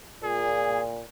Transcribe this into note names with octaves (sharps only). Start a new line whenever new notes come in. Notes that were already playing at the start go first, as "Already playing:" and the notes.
A#2 G#4